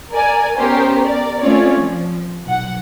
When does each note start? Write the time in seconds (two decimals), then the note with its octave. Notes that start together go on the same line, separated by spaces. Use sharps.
0.11 A#4 D5 G#5
0.57 B3 C#4 G4 A#4 C5
1.00 A#4 D5
1.40 A3 C4 C#4 F4 C#5 D5
1.78 F3
2.44 B1 F#5